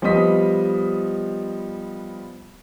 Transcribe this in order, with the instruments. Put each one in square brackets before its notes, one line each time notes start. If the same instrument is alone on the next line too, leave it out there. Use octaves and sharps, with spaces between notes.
[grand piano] F3 G3 B3 D#5 D#6 B6